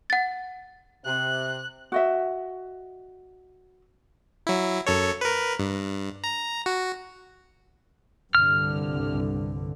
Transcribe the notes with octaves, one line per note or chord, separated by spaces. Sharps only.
F#5 A6
C3 F#6
F#4 D#5 E5
F#3 E4
F#2 A4 C#5
A#4 B4
G2
A#5
F#4
C2 G2 D3 F6